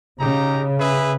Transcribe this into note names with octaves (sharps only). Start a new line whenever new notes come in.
C#3 D#4 G4 A#5
G#4 B4 E5